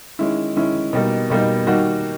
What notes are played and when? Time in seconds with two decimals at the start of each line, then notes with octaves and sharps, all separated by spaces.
0.19 D#3 G#3 C#4 E4
0.56 D#3 G#3 C#4 E4
0.93 B2 G3 A#3 D#4
1.30 B2 G3 A#3 D#4
1.67 D#3 G3 A#3 D#4 F#4